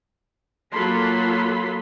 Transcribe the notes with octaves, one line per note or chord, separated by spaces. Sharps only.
F#3 A#3 F4 A4 B5 C6